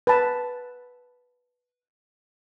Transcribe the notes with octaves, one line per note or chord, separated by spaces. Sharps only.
B4 A5